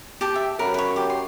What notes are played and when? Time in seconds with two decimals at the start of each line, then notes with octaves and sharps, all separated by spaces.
0.21 G4 G5 A5
0.36 E5
0.59 F#2 A#4 B4
0.74 B4 C#5
0.96 G4
1.10 C6